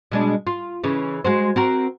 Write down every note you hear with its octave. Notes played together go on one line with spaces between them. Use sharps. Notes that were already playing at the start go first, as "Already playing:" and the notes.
B2 G#3 D4
F4
C#3 E3
G#3 F#4 C5
C4 F#4 A#4